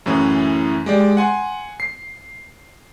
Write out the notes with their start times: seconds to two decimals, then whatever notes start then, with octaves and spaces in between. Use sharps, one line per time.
0.06 F#2 A2 E3 C#4
0.86 G#3 G4 D5
1.17 F#5 G#5 C6
1.80 C7